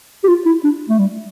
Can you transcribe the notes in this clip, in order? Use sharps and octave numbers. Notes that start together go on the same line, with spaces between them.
G4
F4
E4
D4
A3
G3